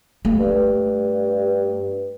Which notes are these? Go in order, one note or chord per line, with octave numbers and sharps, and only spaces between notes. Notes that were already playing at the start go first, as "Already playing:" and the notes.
A3
G2